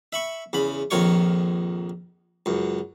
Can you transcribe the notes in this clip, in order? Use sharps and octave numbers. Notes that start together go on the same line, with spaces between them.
E5 B5 C#6
E2 C#3 B5
A#1 F2 D#3 F4 C#5 C#6
C#2 F#2